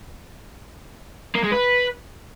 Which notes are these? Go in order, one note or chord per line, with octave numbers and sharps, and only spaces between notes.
A#3
G#3
B4